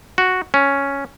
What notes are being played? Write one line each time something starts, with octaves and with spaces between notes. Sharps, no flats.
F#4
C#4